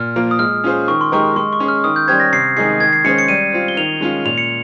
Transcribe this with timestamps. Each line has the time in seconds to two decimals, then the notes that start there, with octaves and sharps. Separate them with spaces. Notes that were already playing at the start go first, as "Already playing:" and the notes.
Already playing: A#2 F6
0.16 F3 A#3 F4
0.31 D#6
0.39 G#3 F6
0.64 C#4 F4 G#4 C5
0.88 D#3 C#6
1.01 C6
1.12 G#3 D#4 G4 A#4 C#6
1.36 G#3 C6
1.53 C#6
1.60 C#4 G#4
1.68 F6
1.84 D#3 D#6
1.96 G6
2.08 G3 C#4 G4 C5 G#6
2.20 A#6
2.32 C3 C7
2.56 D#3 G#3 D#4 G#4 C7
2.80 D#3 G#6
2.93 C7
3.04 G#3 C#4 G#4 C5 C#7
3.18 C#7
3.28 G3 D#7
3.53 C4 F4
3.68 G7
3.77 D#3 F7
4.01 G#3 C#4 F4
4.25 A#2 F7
4.38 C#7